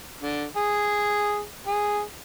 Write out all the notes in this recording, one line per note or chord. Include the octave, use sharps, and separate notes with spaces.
D3
G#4
G#4